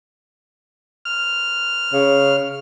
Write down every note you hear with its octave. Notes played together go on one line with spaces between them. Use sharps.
F6
C#3